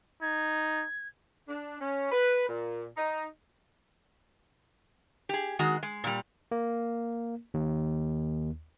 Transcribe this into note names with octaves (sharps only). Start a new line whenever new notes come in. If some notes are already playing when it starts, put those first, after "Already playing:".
D#4 G#6
D4
C#4
B4
A#2
D#4
G4 G#4
D#3 G#3 F#4
G#3
A#2 G3
A#3
D#2